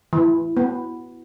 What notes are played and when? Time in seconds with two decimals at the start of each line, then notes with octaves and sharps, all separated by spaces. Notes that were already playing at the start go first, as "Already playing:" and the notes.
0.13 E3
0.57 B3